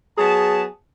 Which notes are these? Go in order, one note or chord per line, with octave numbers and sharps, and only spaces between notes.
F#3 B3 G#4 A5